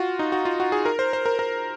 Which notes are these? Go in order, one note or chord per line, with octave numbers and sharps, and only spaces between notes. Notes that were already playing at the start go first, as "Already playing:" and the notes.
Already playing: F4 F#4
D#4
F#4
F4
F#4
G#4
A#4
C5
C5
A#4
A#4